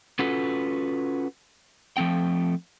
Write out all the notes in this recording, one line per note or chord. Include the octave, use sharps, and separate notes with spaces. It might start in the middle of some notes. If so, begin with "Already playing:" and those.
C#4 F4 F#4 A4 B4
F3 A3 C4 G5